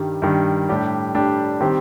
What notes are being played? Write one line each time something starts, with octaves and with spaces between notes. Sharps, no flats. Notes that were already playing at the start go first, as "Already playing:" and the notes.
Already playing: G2 D#3 G3
G2 D#3 G3
A2 G3 D4 G4
A2 G3 D4 G4
D#3 G3 C4 G4